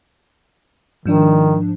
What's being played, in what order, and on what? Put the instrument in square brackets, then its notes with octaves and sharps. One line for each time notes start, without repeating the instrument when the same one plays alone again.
[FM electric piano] G#2 F3 D4 [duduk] D#3